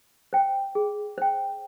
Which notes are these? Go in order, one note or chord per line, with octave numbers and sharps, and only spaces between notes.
C5 G5
G#4
C5 G5